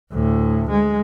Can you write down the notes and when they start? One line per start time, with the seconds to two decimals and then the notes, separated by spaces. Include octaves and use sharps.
0.12 D2 A2
0.69 G#3